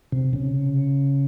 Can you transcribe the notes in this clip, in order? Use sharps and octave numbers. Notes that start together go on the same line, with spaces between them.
C3
C#3